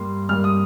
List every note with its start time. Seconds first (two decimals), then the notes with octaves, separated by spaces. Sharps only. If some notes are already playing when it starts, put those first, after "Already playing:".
Already playing: G2 G3 A#3 C6
0.29 G2 G3 A#3 F6
0.44 D#6